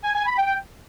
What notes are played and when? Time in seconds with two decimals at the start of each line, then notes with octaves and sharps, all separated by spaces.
0.04 G#5
0.15 G#5
0.27 B5
0.38 G5